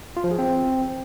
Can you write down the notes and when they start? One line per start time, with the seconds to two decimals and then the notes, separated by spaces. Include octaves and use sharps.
0.17 F4
0.24 F3
0.31 G#4
0.38 C4